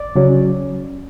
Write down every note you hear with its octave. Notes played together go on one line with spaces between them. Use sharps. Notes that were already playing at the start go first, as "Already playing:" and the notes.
Already playing: D5
C#3 F#3 C#4